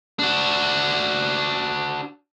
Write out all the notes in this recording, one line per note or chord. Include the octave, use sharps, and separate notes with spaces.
D4 F#4